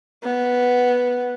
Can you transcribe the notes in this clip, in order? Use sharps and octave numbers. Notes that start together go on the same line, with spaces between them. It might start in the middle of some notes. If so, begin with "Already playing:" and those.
B3